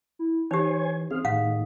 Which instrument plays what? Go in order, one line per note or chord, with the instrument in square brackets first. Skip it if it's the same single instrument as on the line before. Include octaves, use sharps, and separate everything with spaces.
[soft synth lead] E4
[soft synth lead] E3 [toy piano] D#4 G4 [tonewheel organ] C5 C#5 G#5
[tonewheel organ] C4 F5 [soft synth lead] G#4
[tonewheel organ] A2 D#3 [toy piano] F5 F#5